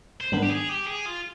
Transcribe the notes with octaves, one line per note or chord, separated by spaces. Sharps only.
C5
G#2 D#3 G3 B3 D4 B4
G4
G#4
G4
G#4
F4